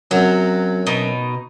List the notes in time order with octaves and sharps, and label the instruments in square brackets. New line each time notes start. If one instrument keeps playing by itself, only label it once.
[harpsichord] F#2 C3 [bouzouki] F#3
[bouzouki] B2 D#4